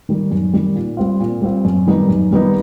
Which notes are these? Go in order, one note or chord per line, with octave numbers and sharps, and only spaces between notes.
D#3 G3
F#2
D#3 G3
A#2
G3 C4 F4
A#2
G3 C4 F4
F#2
D#3 G3 B3 D#4
F#2
D#3 G3 B3 D#4